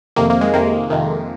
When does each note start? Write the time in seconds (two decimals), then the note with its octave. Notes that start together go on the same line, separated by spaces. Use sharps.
0.16 F2 C3 D#3 A#3
0.30 A#3
0.41 G#3
0.53 F2 C3 D#3 A#3
0.90 F2 C3 D#3